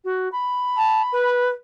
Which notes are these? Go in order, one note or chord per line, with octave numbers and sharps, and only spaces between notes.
F#4
B5
A5
B4